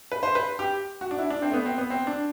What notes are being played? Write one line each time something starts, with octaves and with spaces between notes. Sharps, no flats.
B4
C5
B4
G4
F#4
D4
E4
D4
C4
A3
B3
C4
B3
C4
D4